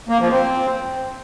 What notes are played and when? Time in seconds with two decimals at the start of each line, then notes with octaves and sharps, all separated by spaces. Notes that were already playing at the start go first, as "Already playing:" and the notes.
0.09 A#3
0.20 F3
0.31 C4